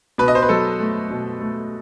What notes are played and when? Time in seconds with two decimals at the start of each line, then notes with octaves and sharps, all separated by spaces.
0.18 B2 B4
0.28 D#5
0.35 C5
0.42 B4
0.49 F#3 A4
0.80 A3
1.10 B2
1.41 A3